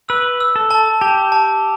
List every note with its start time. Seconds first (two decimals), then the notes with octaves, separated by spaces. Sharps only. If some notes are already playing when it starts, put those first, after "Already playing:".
0.09 B4 E6
0.40 E6
0.56 A4
0.71 A5
1.01 G4 A5
1.32 A5